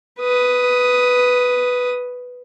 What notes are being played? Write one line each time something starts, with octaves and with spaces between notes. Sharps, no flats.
B4 D#6